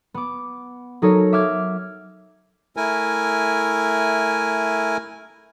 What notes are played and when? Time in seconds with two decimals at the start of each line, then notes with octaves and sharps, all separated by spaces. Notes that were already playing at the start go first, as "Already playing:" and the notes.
0.14 B3 D6
1.02 F#3 D#4 A4 A#4 C#5
1.33 E5 D6 F6 G#6
2.77 A3 E4 A#4 G#5